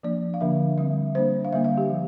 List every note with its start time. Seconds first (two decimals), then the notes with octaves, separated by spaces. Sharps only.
0.03 F3 A#3 D4 D5
0.34 F5
0.41 D3 F3 A#3 D4 E5
0.78 D3 G3 C4 E5
1.15 G3 A#3 D4 C5
1.45 F5
1.53 D3 G3 A#3 D4 E5
1.64 F5
1.77 G4
1.90 F3